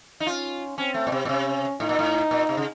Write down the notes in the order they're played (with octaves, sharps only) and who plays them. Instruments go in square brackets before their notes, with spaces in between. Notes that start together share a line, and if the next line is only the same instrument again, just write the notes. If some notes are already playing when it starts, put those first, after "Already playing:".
[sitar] D#4
[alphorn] C#4 [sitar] F4
[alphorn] C4 [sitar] C#4
[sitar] A3
A#2
C3
A#2
[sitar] C3 [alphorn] C#4
[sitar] A2 [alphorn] D#4
[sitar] A#2
A2
A#2
C3
C#3